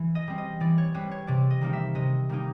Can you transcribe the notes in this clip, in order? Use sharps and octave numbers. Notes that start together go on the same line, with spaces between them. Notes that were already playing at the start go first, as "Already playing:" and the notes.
Already playing: E3
D#5
G3 C4
D#5
E3 D5
C#5
G3 C4 B4
C#5
C3 D5
D#5
D#3 G3 A#3 D#4
E5
C3 D#5
D#3 G3 A#3 D#4